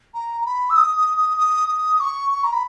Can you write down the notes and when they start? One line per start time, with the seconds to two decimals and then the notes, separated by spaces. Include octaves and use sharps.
0.14 A#5
0.41 A#5
0.46 B5
0.69 E6
0.76 D#6
0.97 D#6
1.17 D#6
1.37 D#6
1.68 D#6
2.00 C#6
2.30 C#6
2.43 A#5
2.52 B5